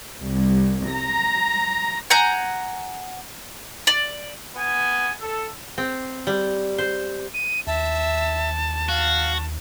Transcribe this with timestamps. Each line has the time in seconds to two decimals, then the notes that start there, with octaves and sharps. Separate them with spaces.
0.23 C2
0.91 A#5
2.10 F#5 G#5 A#5 G6
3.87 D5
4.56 B3 G#5
5.20 A4
5.78 C4
6.27 G3
6.78 C5
7.34 D#7
7.67 D#2 E5 A5
8.89 F#4 F5